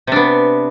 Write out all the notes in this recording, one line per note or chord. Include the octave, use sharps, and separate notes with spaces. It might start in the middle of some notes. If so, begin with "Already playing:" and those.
C3 B3 D4